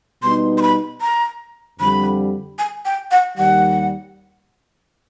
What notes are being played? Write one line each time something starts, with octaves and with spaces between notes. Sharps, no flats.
B2 G3 B3 D#4 C6
C6
B5
A#5
F2 D3 G3 B5
G#5
G5
F#5
D#2 D#3 G3 F#5